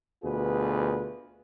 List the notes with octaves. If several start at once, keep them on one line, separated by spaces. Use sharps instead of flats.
D2 B2 F4 G#4 B4